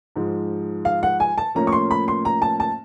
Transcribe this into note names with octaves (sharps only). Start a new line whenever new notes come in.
G#2 F3 G#3
F5
F#5
G#5
A5
A2 F3 A#3 C#4 A#5
C#6
C6
B5
C6
A#5
A5
A5